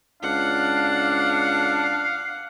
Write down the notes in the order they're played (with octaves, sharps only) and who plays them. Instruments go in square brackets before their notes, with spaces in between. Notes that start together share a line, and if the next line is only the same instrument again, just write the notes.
[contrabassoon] C#2 [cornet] D4 [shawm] F5 [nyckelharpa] F#5